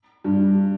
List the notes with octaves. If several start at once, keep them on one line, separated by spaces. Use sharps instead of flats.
G2